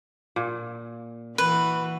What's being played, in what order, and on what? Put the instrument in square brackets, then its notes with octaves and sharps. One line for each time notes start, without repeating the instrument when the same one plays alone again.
[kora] A#2
[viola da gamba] E3 F#4 [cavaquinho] B4